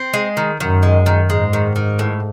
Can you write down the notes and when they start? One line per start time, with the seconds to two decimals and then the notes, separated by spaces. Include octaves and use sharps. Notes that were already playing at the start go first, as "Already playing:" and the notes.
Already playing: C4
0.14 G#3
0.37 D#3
0.60 F#2 D#3
0.83 G#3
1.06 D#3
1.30 G#2 G#3
1.53 D#3
1.76 D#3
1.99 A2